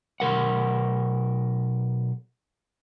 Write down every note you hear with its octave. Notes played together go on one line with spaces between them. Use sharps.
B1 B2 A#4 F#5